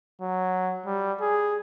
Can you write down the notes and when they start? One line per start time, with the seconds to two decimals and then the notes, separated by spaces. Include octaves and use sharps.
0.21 F#3
0.86 G3
1.21 G#4